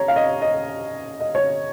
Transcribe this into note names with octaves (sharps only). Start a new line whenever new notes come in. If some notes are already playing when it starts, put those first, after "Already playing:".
Already playing: C#5 A#5
F5
D#5
D#5
D#5
C#5